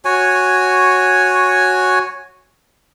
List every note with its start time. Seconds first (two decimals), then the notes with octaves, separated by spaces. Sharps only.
0.05 F#4 C#5 G#5